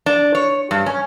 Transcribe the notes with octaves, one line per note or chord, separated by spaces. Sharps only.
D4
C#5
G2
C#4